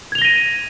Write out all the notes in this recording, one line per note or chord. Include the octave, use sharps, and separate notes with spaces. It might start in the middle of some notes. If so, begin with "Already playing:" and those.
G#6 A#6 D#7 F7 G7